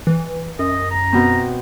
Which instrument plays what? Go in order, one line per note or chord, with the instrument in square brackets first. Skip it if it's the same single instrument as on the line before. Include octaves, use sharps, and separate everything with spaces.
[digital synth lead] E3
[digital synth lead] F#2 [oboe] D#5
[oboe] A#5
[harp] B2 C4